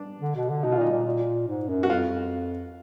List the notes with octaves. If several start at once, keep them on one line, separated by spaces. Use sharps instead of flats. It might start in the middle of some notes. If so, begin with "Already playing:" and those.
Already playing: D4
D3
B2
D3
B2 D#4
F4
A#2 D#4
A#2
A#2
G#2
F#2
F#4
F2 F4